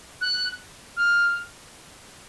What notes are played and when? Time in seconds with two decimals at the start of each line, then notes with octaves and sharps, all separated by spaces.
0.21 F#6
0.96 F6